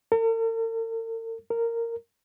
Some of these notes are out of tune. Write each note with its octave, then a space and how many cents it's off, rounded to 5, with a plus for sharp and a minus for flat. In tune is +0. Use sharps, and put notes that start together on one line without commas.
A#4 -45
A#4 -10